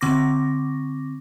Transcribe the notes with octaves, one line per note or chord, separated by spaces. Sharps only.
D3 C4 C#6 D6 A#6